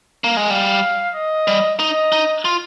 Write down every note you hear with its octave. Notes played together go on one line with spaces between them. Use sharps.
A#3
G#3
G3 F5
D#5
G3
D#4 D#5
D#4
F4